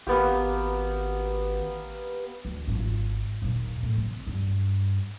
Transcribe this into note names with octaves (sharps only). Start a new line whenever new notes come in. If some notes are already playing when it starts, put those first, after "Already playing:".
G#1 A#3 B3 G4
D2
G#1 F4
D#2 A#2
A2
C3
G2